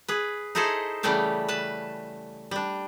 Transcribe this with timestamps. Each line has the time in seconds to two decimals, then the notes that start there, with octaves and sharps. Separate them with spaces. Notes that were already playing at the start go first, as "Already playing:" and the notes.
0.08 G#4 B4
0.55 D#4 E4 G#4 A4 C5 D#5
1.03 C#3 E3 G3 A3 G4 F5
1.48 B4 A5
2.51 G3 D4